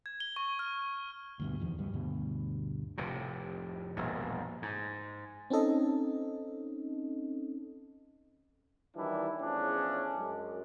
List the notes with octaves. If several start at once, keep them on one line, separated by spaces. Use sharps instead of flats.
G#6
G7
C#6
F6
D2 G2 B2
F1 E2 D#3 F3
C#2 G2 F#3 G3
D2 G2 B2
F1 A2 C3
E1 A#1 G2
G#2
C4 C#4 D#4 A4 D#5
D#3 E3 F#3 G3 D4 E4
E2 A2 F3 C#4 D4 G#4
F#2 G#3